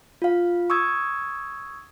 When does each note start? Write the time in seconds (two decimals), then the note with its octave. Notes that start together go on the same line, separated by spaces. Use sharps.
0.22 F4 F5
0.70 C#6 D#6 E6 G#6